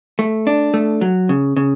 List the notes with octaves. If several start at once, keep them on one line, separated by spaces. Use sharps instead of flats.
A3
D4
A3
F#3
C#3
C#3